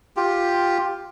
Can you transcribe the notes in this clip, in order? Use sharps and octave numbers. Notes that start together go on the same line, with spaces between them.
F4 G4